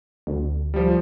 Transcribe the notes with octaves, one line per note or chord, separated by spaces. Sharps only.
D2
F3 G3